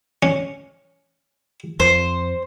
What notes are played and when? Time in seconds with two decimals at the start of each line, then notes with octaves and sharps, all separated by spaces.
0.23 C#4
1.80 F2 C5